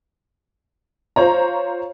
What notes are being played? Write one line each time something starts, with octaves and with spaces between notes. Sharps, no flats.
F4 C5 C#5 A#5